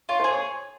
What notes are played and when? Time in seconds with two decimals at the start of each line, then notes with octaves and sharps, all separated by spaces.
0.09 F4 C#5
0.20 G#4 C5
0.31 C#5